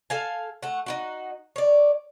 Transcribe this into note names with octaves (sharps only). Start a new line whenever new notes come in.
A4 F5 G#5
A3 F#5
D#4 E4 F#4
C#5 D5